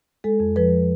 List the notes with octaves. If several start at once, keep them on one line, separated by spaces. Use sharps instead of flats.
G#3 A4
F2
F3 B4